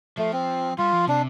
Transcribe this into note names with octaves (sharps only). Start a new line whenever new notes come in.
F3 A3
C4
G3 F4
F3
C3 D4